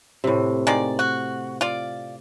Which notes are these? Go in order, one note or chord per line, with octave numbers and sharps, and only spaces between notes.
A2 C3
D#3 G#3 D5
F#4
F4 D5